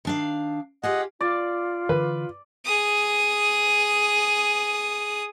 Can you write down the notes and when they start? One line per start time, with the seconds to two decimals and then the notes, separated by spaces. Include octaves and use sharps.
0.05 D#3 D4 F5
0.83 F4 G4 G#4 D#5 F#5
1.21 F4 D5
1.89 D3 E3 B4
2.65 G#4 D#6